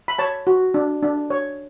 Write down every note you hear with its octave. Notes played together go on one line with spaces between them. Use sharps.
B5
C#5 A5
F#4
D4
D4
C#5